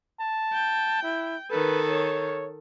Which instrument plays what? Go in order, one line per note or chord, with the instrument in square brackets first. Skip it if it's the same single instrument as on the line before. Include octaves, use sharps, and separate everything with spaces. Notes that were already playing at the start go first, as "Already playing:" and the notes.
[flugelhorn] A5
[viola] G5
[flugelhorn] E4
[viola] D#3 A4 [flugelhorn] B4
[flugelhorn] C#5